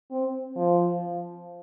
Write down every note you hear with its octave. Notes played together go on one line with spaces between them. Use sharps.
C4
F3